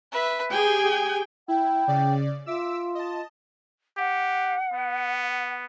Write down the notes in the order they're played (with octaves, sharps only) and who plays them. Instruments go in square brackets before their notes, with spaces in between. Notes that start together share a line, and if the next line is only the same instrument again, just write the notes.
[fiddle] B4 E5
[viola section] G4 G#4 G5 [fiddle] G#5
[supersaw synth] E4 [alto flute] G5
[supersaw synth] C#3 D5
[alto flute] F4 [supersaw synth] E5 D6 E6
[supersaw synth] D#5 A5
[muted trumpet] G4 [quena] F#5
[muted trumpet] B3